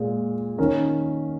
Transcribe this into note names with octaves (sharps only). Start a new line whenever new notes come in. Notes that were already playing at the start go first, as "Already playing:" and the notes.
Already playing: A#2 G#3
D#3 C#4 A#4